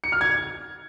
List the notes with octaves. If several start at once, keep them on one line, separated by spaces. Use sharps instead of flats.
C#7
F6
G#6